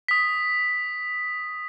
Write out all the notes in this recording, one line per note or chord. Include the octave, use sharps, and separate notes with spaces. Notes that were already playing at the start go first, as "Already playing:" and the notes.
D#6 B6